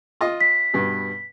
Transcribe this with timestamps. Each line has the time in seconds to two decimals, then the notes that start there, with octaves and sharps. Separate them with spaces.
0.21 F4 D#5
0.41 B6
0.73 G2 B2